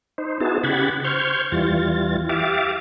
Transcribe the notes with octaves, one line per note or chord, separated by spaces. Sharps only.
D#4 C5
B3 D#4 E4 F#4 G#4 A5
C#3 G4 F#5 B5 G#6 A6
C5 C#6 F6 G6 G#6
E2 E3 G3 F4 A6
G4 E5 F5 D6 A6